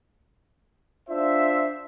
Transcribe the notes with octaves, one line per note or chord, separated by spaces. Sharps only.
D4 F4 C5 E5